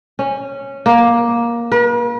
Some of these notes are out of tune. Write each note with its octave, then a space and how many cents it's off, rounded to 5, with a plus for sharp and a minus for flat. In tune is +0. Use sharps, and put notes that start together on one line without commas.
C#4 -10
A#3 +15
B4 -45